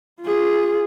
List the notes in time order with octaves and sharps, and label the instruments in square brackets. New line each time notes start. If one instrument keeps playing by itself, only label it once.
[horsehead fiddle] F4 G#4